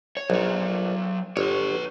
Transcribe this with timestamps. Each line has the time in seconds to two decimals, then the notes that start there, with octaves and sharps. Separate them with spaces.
0.17 C#5
0.30 A#1 F#3 D#4
1.37 G1 B4 C#5